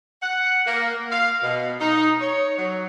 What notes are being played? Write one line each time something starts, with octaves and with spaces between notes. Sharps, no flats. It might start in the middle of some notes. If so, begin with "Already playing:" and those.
F#5
A#3
F5
B2
D#4
C#5
F#3